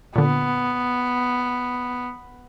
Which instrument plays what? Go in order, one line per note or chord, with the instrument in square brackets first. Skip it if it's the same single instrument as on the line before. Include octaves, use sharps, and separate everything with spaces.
[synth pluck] A#2 D3 [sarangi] B3